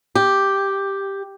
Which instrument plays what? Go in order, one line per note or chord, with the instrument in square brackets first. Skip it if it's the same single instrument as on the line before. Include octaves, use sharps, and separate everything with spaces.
[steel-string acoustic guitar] G4